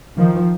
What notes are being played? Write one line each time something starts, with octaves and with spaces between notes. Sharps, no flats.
D#3 F3